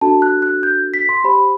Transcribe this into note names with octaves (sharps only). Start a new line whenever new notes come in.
D4 F#4 A4 A5
F#6
F#6
G6
B6
C6
G4 C5 B5